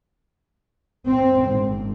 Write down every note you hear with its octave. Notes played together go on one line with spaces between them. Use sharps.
C4
G#1